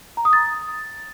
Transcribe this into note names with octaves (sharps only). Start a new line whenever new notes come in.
A#5
D#6
A6